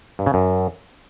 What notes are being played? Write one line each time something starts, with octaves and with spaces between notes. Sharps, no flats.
G2
C#3
F#2